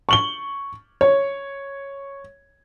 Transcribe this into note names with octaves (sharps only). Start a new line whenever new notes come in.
C#6 F#7 G7
C#5